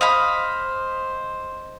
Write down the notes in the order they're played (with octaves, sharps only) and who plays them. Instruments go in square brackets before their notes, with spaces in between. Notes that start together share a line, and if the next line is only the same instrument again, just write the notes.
[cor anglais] C5 [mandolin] D#5 F5 B5